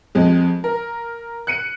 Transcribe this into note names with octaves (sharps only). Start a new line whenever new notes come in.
F2 G#3
A#4
F#6 C#7 D#7